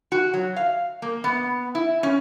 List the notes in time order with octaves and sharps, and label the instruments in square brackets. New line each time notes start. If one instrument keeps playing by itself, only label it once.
[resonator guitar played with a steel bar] F#4
F#3
F5
A#3
B3
E4
C#4